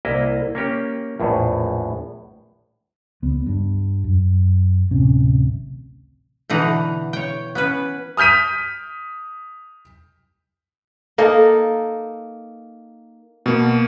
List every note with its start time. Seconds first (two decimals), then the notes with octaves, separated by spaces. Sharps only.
0.05 C2 A#3 E4 D#5
0.55 A#3 C#4 G4
1.20 A#1 E2 A2
3.22 C#2 B3
3.47 G2
4.04 F#2
4.91 D1 A1 C3 C#4
6.49 B2 D3 E3 D#4 F#5
7.13 C#5 G5
7.55 B3 C#4 B4
8.17 D#6 F6 G6 B6 D#7
11.18 A#3 D#4 A4
13.46 B2 A#3